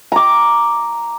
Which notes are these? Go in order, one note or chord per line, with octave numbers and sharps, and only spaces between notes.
A#5 D6